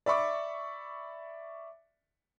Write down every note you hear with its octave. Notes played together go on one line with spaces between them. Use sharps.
D5 E5 B5 C#6 D6